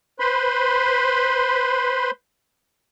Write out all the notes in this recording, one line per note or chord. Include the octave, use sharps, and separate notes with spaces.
B4 C5 B5 C6